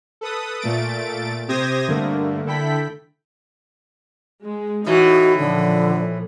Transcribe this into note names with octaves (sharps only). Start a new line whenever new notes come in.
A4 B4 D#6
A#2 A3 A6 D7
C3 G4 C5 D#6 G#6 A#6
G2 D3 A3 A#3
D3 E4 A4 G5 B5 B6
G#3
A2 E3 D#4 F#4
A#2 D3 F3